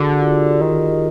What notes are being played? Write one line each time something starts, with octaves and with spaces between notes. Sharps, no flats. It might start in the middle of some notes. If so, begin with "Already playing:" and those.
Already playing: D3 F#4 G#4
F#4
F4 G4
D#3